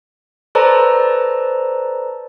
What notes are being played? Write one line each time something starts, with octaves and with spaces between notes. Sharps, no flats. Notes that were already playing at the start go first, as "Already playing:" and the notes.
A4 B4 C5 D5 A5 A#5